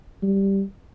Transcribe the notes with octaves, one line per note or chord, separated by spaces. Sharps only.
G3